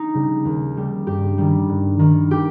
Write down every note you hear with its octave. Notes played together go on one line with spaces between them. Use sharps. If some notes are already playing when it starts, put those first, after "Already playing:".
Already playing: D#4
C#3 G3
D#2
C#3 G3
G2 G4
D#3 G3
G2
D#3 G3
G4